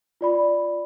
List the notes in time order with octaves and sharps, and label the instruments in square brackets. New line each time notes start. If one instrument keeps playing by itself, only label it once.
[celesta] F4 D5 B5